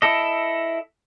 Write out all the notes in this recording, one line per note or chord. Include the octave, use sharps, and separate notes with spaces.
E4 A4 D#5